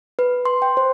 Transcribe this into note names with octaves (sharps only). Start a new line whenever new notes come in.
B4
C6
G5
C5